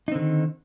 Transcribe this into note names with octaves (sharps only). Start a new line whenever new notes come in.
D3 D#3 C4 D#4